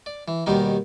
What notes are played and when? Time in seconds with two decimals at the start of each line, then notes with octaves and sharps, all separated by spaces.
0.06 D5
0.28 E3
0.46 D#2 B2 D#3 G3 D#4